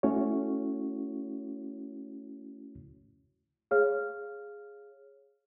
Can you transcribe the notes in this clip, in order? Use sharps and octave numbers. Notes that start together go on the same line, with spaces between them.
A3 C#4 E4 F#4 C#5
G#4 C#5 F5 F6